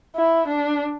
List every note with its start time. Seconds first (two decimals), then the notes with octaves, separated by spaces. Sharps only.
0.17 E4
0.48 D4